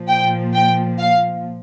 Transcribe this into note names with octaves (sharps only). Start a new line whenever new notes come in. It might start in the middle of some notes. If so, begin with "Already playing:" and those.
Already playing: A#2 F3
G5
G5
F5